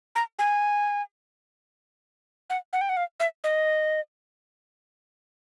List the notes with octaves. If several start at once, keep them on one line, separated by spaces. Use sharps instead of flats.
A#5
G#5
F#5
F#5
G5
F#5
F5
E5
D#5